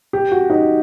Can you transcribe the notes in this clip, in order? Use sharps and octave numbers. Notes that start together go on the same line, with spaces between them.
G4
F#4
D#4